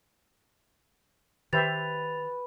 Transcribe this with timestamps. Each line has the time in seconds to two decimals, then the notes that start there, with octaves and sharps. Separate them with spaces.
1.53 D#3 G4 B4 C5 E5 A6 F7